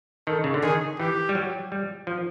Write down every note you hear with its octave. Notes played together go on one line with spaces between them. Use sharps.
D#3 A4
C#3
D3
D#3 G#4
E3 G4
G3
F#3
G3
F3